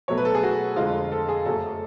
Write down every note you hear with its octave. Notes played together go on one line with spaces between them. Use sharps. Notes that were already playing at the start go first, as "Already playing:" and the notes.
B2 F#3 A3 C#5
B4
A4
G#4
F#4
F2 D3 G#3 F4
A4
G#4
F#2 C#3 F#3 A3 A4